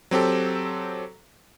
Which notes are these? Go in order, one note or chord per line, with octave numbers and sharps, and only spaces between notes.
F#3 C4 G4 A4